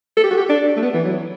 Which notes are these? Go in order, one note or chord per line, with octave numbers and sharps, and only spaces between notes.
A4
G4
F#4
G4
D4
A3
B3
E3
F#3